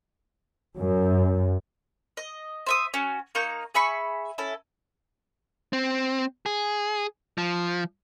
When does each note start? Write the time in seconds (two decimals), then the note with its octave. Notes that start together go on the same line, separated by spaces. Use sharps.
0.76 F#2
2.17 D#5
2.66 C5 E5 D#6
2.94 C#4 F#4
3.35 A#3 D#4 C#6 G6
3.74 G#4 E5 B5 C#6
4.38 C#4 E4 A4
5.73 C4
6.46 G#4
7.38 F3